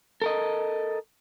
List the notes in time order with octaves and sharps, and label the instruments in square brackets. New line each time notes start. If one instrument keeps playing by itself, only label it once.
[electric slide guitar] A4 A#4 D#5